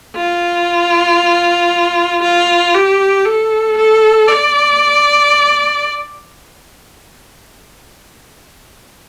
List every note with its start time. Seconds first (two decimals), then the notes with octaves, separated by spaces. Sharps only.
0.16 F4
2.22 F4
2.74 G4
3.25 A4
3.77 A4
4.28 D5